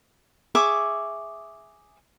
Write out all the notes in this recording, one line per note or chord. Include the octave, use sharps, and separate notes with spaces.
G#4 E5 C#6 D6